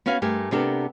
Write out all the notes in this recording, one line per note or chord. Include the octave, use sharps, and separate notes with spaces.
B3 C#4 F#4 F5 G#5
G2 A3 G4 A#4 G#5
C3 B3 D4 G4 A4 A#4